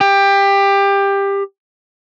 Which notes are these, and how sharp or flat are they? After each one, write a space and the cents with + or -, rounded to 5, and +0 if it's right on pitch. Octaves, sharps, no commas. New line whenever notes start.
G4 +20